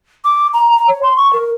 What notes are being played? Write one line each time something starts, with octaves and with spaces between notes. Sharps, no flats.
D6
A#5
A#5
C#5
C6
C#6
A#4